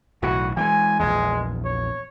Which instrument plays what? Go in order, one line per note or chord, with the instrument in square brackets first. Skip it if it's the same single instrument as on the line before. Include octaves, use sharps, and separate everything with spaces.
[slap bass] B1 A2 E3 [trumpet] F#4
[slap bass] E3 F3 G#3 [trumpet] G#5
[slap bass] A#1 E2 [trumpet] G#3
[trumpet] C#5